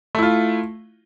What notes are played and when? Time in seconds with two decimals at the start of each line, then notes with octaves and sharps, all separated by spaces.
0.15 A3
0.19 E4
0.23 F4